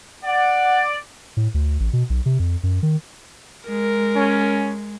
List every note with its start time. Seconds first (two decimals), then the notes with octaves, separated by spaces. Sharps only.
0.25 D5 F#5
1.37 A2
1.54 D2
1.80 A1
1.93 B2
2.10 B1
2.26 C3
2.39 F2
2.63 F#2
2.83 D#3
3.69 G#3 A#4
4.16 C#4